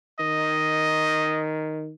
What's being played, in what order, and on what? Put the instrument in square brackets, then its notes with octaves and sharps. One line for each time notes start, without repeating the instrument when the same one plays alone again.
[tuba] D#3 [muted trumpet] D#5